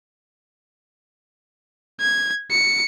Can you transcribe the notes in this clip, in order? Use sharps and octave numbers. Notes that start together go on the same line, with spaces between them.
G#6
C#7